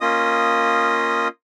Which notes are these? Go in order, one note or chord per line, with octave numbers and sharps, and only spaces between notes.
A#3 C#4 F4 D#5 D#6